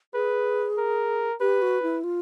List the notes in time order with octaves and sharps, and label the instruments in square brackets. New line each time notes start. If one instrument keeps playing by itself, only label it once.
[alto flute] G#4 [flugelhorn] B4
[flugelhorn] A#4
[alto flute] G4 [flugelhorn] B4
[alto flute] F#4
E4
F4